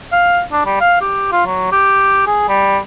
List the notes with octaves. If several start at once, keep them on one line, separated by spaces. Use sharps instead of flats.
F5
D4
G3
F5
G4
F4
F#3
G4
G#4
G3